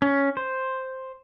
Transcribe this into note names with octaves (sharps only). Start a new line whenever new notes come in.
C#4
C5